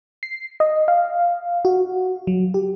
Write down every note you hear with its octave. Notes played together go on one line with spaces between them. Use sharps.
C7
D#5
F5
F#4
F#3
G4